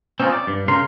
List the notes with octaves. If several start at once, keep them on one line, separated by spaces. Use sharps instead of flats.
C4 C#4 D#4 F4
D5
G2
C#3 A#4 C6